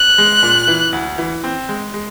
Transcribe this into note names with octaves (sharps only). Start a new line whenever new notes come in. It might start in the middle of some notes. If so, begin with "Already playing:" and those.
Already playing: F#6
G#3
A#2
E3
D2
E3
C4
G#3
G#3